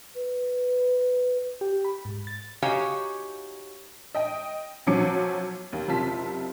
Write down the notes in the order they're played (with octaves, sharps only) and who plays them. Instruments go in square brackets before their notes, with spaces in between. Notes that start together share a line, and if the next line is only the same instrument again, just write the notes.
[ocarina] B4
[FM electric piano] G4
B5
G#2
A6
[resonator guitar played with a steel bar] D#4 F#4 G4 C#5 F5 G#5
[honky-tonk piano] D#5 G5
B1 F3 F#3 C#4 D6 C#7
D#2
F#1 C3 F4 A5 F6 B6